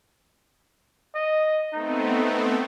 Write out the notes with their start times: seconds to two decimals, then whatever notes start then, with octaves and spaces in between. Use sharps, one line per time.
1.15 D#5
1.73 A3 B3 C4 D#4